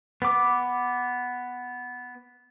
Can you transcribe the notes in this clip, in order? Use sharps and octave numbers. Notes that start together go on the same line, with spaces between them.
B3 D6